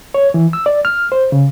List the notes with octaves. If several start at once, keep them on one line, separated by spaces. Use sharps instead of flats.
C#5
E3
E6
D5
F6
C5
C#3